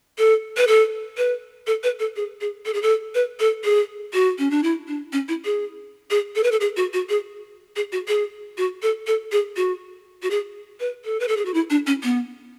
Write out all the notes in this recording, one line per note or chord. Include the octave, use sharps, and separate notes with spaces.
A4
B4
A4
B4
A4
B4
A4
G#4
G#4
A4
G#4
A4
B4
A4
G#4
F#4
C#4
D4
E4
D4
C#4
E4
G#4
G#4
A4
B4
A4
G#4
F#4
F#4
G#4
G#4
F#4
G#4
F#4
A4
A4
G#4
F#4
F#4
G#4
B4
A4
B4
A4
G#4
F#4
E4
D4
C#4
B3